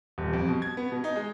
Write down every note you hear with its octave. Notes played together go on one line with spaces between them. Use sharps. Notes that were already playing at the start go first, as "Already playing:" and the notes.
D#1
F2
B2
G#6
B3
B2
D#4
G#3